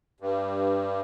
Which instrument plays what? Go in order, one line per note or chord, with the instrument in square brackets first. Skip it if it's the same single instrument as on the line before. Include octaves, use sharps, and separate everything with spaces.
[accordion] G2